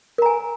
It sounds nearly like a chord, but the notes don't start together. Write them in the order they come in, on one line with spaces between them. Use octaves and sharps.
A#4 A#5 G#5